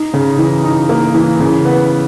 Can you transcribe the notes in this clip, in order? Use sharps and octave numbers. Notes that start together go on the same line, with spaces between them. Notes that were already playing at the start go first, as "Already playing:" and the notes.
Already playing: D#4
C#3
E3
D#4
A#3
E3
C#3
B3